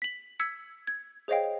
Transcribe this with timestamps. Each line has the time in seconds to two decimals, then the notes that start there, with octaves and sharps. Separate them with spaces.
0.02 B6 F#7
0.40 E6 G#6 B6 C#7
0.87 G#6
1.28 G#4 C5 C#5 D#5 F5 G5